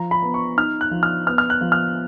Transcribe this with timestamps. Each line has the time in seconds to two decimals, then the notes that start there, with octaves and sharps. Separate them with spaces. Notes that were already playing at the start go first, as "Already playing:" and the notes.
Already playing: F3 A#5
0.11 B5
0.22 B3
0.34 C#6
0.57 D#4 F6
0.81 F#6
0.91 F3
1.03 F6
1.27 B3 F6
1.38 F6
1.50 F#6
1.61 F3
1.72 F6